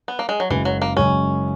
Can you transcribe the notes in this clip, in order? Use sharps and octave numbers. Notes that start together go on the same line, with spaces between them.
B3
A#3
G#3
F#3
F#1 F#2 C#3 E3 G#3
F#3
A#3
F#1 F#2 C#3 G#3 C#4